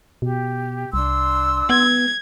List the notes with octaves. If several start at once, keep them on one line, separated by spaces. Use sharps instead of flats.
B2 G4
C2 D4 C6 E6
B3 G#6